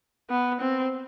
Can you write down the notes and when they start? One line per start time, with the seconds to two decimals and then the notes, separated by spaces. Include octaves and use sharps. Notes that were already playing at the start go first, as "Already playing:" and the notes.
0.30 B3
0.60 C4